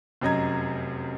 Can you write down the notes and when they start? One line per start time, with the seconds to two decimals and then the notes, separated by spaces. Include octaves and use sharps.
0.21 F1 F#2 F#3 D#5 A#5 G#6